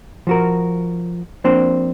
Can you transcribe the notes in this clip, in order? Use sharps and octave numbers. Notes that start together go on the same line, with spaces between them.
F3 F#4 A#4
F3 A#3 C4 D4 C5